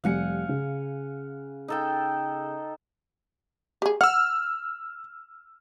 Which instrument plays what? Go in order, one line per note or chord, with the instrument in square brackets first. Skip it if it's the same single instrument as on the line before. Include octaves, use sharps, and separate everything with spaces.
[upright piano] F1 G3 C#7 [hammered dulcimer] F5 F#5 G#5
[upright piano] C#3
[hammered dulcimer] D#4 A4 G5
[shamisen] G4 G#4
[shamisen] F#5 [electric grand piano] E6 F6